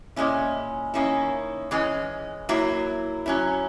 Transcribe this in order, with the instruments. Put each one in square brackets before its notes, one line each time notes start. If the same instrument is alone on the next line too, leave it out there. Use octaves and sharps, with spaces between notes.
[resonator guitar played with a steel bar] A#2 G#3 C#4 E4
D#3 A#3 C#4 E4
E3 G#3 C#4
F#3 A#3 E4
F#3 C#4 E4